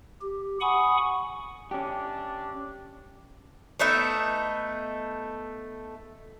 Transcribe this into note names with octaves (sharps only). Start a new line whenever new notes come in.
G4
F#5 G#5 B5 C#6 D#6
C#4 D4 G4
A3 B3 D#4 E5